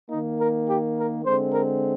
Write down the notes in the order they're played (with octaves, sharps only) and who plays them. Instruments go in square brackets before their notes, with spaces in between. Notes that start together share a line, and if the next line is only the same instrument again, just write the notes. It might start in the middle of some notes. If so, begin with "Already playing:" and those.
[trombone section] D#3 A#3 D#4
A#4
G4
A#4
D3 G#3 C4 C5
A#4